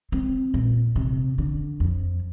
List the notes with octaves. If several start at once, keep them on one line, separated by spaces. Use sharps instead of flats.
C4
A#2
C3
D3
F2